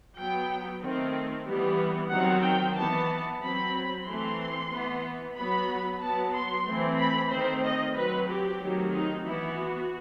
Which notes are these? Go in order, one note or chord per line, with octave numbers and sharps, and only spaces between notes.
F#3 B3 G5
D#3 A3 C4
E3 G3 B3
D#3 F#3 C4 F#5
G5
E3 B3 A5
F#3 C4 B5
E3 A3 C4 C6
E3 B3
F#3 B3 B5
F#3 B3 A5
C6
E3 A3 C4
B5
D#3 A3 C4 C5
D#5
F#3 C4 B4
G4
D#3 F#3 A3 C4
D#4
E3 B3 E4
F#4